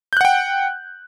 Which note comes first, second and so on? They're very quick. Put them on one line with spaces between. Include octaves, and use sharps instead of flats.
G6 F#6 F#5 G5